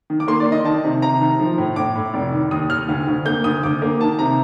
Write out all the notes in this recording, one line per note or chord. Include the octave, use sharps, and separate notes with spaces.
D#3
D6
A#3 C6
D5
D#3
D#5
D#3 A5
C3
C3 A#5
D#3
F3
A2
A2 D6
A2
F1
D#3
D#2 D#6
D#2 F6
D2
D2
A#3 G6
D2 D#6
D2 D6
A#3
D#3 A5
C3 A#5